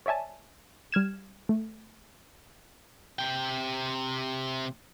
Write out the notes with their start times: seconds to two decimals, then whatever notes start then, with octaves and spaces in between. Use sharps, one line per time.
0.06 C#5 D5 E5 G#5 A5
0.92 G3 F6 G#6 E7
1.49 A3
3.19 C3 G5